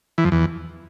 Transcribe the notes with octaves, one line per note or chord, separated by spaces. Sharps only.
E3
F2
E2